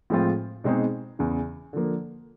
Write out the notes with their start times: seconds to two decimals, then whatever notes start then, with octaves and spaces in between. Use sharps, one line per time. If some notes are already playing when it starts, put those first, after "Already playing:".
0.10 A2 F3 G#3 C4 F4
0.64 B2 G#3 C4 D#4 G#4
1.19 E2 C#3 E3
1.73 D3 F3 A#3